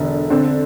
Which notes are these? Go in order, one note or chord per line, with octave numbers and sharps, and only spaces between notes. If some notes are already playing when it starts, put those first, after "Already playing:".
Already playing: E1 D3
D3 C4